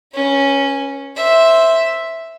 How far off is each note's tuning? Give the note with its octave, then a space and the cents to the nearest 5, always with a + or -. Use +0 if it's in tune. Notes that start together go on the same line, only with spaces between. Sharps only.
C#4 -5 B4 -40
C5 +0 E5 +0